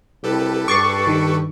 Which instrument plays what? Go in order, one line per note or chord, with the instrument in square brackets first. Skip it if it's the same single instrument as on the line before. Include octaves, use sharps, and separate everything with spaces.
[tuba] C2 [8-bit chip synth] G4 A4 B4
[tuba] G2 [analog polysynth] C#6 [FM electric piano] D6 A6 C7
[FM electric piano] D#3